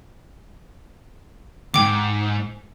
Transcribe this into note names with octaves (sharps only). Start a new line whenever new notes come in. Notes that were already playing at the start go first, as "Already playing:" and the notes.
E2 G#2 G5 D6